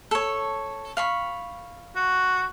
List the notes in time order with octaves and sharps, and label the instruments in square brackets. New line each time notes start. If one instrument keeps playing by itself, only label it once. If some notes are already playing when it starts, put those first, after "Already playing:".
[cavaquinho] A4 C#5
F5 B5 C#6
[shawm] F#4